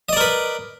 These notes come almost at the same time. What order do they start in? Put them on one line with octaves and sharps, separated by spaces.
D#5 D5 A#4 B4